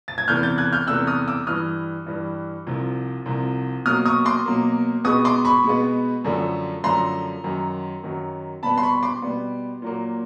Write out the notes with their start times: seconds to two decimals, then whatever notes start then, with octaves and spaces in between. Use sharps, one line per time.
0.08 A6
0.18 G#6
0.28 E2 C3 E3 A3 F6 G6
0.43 G6 A6
0.58 F#6 G#6
0.72 F6 G6
0.87 E2 C3 E3 A3 E6 F#6
1.07 D#6 F6
1.28 D6 E6
1.47 G2 E3 G3 D#6 F6
2.06 G2 E3 G3
2.67 C2 C3 F3
3.26 C2 C3 F3
3.86 B2 F#3 A#3 D#6 F6
4.06 C#6 D#6
4.25 C6 D6
4.46 B2 F#3 A#3
5.04 B2 G#3 B3 C#6 D#6
5.25 C6 D6
5.45 B5 C#6
5.64 B2 G#3 B3
6.24 F#2 D3 F3 A3
6.83 F#2 D3 F3 A3 A#5 C6
7.44 F#2 D#3 F#3
8.03 F#2 D#3 F#3
8.63 B2 G3 B3 A5 B5
8.78 C6
8.83 B5 C#6
9.03 C6 D6
9.22 B2 G3 B3
9.82 A#2 F#3 A#3